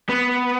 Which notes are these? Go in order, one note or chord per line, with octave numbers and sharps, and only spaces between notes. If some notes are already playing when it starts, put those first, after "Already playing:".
B3